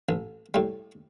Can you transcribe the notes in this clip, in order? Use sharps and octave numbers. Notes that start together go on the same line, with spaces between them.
A1
A2 G3